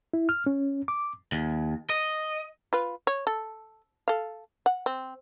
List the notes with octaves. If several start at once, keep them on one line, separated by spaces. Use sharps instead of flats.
E4
F6
C#4
D6
D#2
D#5
F4 B4
C#5
A4
A4 F5
F#5
C4